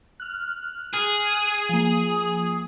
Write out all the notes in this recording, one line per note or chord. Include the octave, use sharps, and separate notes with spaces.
F6 F#6
G#4
F3 A#3